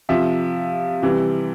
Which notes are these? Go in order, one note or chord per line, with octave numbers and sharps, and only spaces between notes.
C3 F3 E5
C3 E3 G3